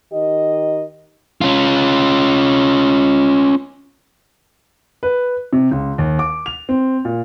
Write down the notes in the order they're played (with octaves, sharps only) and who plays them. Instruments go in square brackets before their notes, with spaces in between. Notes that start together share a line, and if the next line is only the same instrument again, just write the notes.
[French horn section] D#3 G4 D#5
[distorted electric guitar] C#4 F4
[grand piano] B4
C3
C#2
D#2
D6
F7
C4
A#2